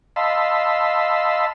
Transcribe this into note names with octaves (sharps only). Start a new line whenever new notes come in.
D#5 F5 A5 B5 C6 E6